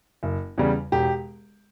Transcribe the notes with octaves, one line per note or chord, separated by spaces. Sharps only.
F#1
E2 C#3 G3
E1 G4